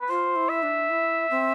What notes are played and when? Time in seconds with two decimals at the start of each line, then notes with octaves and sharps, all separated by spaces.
0.01 B4
0.09 F4 C5
0.36 E4
0.49 E5
0.63 D4
0.90 E4
1.31 C4